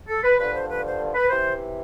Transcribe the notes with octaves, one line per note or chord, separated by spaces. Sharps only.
A4
B4
G2 D3 F3 B4
C5
B4
C5
B4
C3 E3 C5